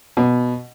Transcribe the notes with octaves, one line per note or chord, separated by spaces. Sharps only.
B2